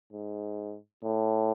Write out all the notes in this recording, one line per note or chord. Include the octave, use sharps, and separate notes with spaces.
G#2
A2